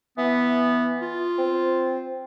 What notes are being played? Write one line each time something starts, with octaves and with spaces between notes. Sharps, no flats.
E3 B3
F4
C4